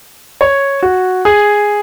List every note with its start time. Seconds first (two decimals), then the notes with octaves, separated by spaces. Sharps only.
0.41 C#5
0.83 F#4
1.25 G#4